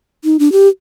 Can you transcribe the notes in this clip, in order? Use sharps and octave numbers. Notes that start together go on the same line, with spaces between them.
D#4
D4
G4